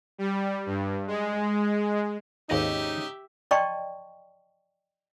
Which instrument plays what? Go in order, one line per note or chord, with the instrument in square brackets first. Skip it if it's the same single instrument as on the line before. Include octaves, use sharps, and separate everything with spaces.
[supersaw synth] G3
G2
G#3
[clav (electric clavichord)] G#1 D#2 D#5 [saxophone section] G#2 C#3 D#4 [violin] G4 E5
[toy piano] D5 D#5 G5 A5 C6 C#6